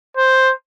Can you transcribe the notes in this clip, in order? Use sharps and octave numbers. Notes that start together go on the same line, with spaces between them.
C5